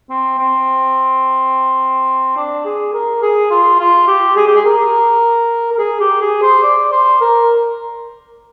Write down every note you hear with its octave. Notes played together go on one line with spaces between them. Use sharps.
C4
C4
D4
G#4
A#4
G#4
F4
F4
G4
G#4
G4
G#4
A#4
A#4
G#4
G4
G#4
C5
D5
C5
A#4